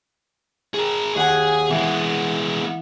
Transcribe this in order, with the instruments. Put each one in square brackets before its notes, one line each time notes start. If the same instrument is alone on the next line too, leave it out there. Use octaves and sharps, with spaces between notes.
[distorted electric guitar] G#4 A#4
[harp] D#2 F#5 G#5 [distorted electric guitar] G#4
[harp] E3 [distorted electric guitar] G#3 B3